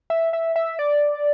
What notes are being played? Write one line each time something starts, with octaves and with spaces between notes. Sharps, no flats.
E5
E5
E5
D5